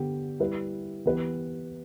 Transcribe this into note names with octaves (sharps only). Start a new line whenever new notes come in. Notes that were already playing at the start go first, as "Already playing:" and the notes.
Already playing: D3 B3 G4
G3 E4 B4
E3 B3 G4 B4